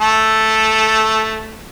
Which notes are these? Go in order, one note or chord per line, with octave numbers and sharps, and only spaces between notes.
A3 A4